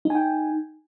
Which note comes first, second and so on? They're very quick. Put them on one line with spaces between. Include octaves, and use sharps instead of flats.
D#4 G#5 G5